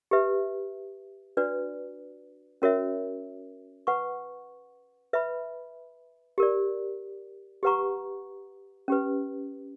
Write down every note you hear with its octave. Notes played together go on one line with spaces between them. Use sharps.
G4 B4 E5
D4 F#4 B4 D5
C#4 F#4 A#4 C#5 E5
B4 F#5 C#6
B4 E5 B5
G4 A#4 D5
G4 B4 F#5 A#5 C#6
C#4 G4 B4